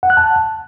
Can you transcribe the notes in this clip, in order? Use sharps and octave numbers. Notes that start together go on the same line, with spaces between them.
F#5
F#6
A5